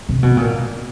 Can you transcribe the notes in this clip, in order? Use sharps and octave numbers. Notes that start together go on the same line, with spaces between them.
C3
B2
A#2